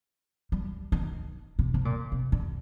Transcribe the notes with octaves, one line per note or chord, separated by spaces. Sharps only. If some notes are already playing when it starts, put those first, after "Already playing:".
G3
D#3
C3
C3
A#2
C3
D3